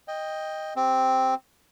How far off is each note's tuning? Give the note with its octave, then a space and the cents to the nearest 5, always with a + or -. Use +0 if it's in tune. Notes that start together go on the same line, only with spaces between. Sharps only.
D#5 +0 G5 +15
C4 +0 G4 +0